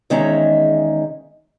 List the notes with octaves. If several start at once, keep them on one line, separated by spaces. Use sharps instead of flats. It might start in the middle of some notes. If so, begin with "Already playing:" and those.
E2 D#3 G#3 C#4 E5 A#5